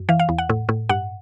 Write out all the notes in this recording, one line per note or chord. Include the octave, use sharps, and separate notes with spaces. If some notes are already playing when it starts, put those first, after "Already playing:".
Already playing: F#2
E3 F5
F5
E2
F#5
A2
A2
G2 F#5